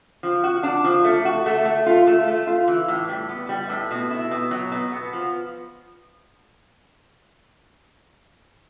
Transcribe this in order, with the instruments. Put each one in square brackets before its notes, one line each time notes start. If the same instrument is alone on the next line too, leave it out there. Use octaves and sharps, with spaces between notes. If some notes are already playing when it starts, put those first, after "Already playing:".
[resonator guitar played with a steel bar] F3
F#4
D4
F3
A3
F#4
A3
A3
F4
A3
A3
F4
E3
A2
G3
B3
G3
A2
B2
E4
B2
F#3
B2
B3
F3